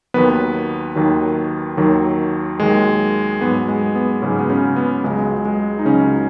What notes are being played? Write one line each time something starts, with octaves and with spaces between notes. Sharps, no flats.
D#2 D#3 F#3 B3 B4
D#2 D#3 F#3
D#2 D#3 F#3
D#2 D#3 F#3 G#3
G#2 F#3 B3
G#3
B3
G#2 C#3 F#3 C#4
B3
C#3 C#4
B3
C#2 C#3 F#3 G#3
G#3
D#4
C#2 C#3 F#3 C#4